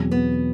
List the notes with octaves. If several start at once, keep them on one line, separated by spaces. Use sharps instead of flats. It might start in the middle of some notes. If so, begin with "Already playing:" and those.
Already playing: E2 B2 F#3 C4
B3